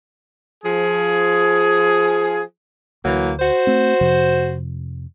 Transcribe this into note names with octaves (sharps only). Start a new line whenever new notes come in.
F3 G#4
D2 E3 F#3 A#3
F#4 C5
A3 C4
F2 C3 F3